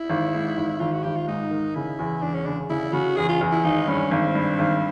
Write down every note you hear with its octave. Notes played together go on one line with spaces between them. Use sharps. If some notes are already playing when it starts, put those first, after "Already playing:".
Already playing: E4
G#1
G#2
G#1
G#1 F4
F#4
G#1 G4
F4
G#2 D#4
D#3
C#3 E4
E2
E1 D4
C#4
C#3 D4
C#3 E4
C#3 F#4
E2 G#4
F4
E2
E4
G#1 D#4
G2 C#4
G#1 C4
G2
G#1